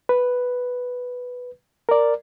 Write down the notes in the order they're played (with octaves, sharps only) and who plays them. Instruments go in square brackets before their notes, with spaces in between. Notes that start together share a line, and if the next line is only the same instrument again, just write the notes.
[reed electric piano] B4
A#4 D5